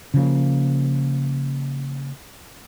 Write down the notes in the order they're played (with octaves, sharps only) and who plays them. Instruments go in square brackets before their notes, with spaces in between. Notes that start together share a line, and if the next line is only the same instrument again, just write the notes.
[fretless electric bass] C#3 F3 A#3